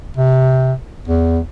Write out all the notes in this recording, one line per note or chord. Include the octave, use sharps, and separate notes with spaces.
C3
E2